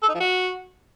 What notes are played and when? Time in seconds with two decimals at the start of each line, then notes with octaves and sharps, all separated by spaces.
0.03 A4
0.09 D#4
0.14 F3
0.20 F#4